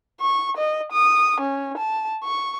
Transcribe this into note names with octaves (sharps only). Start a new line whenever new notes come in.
C#6
D#5
D#6
C#4
A5
C#6